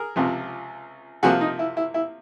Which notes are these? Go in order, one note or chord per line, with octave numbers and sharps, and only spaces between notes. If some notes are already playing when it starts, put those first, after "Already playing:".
Already playing: G#4 A#4
C#2 C3 F3
C3 F3 A#3 F#4 G#4
D#4
E4
E4
E4